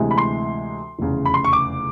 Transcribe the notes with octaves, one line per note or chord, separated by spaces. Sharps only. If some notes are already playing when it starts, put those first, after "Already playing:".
Already playing: D2 C3 E3 G#3
B5
C6
F1 E2 C#3
B5
C6
C#6
D6